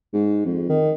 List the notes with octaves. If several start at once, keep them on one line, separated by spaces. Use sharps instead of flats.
G#2
F2
D#3